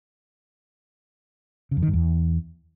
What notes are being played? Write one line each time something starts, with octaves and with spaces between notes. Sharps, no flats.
C#3
F2
D#3
G2
E2